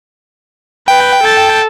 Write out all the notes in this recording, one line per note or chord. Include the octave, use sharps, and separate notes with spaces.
B4 G5
A4 A5